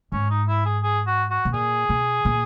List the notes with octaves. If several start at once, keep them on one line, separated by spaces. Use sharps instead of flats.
G#2 C#4
D#4
E4
G#4
G#4
F#4
F#4
B2
A#2 G#4
B2
A#2